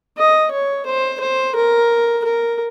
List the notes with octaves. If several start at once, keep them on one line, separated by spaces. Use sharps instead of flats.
D#5
C#5
C5
C5
A#4
A#4